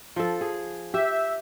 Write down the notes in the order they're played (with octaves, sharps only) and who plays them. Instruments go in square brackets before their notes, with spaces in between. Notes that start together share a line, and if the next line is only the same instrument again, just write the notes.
[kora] F3 A4
G#4
[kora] G4 [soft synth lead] E5